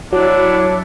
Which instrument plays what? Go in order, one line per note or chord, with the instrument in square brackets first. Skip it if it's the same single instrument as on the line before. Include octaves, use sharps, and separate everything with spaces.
[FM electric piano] F#3 [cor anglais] D4 [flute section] E4 C#5 F#6